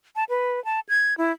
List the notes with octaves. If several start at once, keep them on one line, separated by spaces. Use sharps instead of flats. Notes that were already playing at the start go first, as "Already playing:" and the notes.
A5
B4
A5
G#6
E4